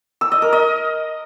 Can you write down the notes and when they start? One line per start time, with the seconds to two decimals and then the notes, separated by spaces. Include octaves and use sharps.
0.21 E6
0.32 D#5
0.42 A#4
0.53 D#5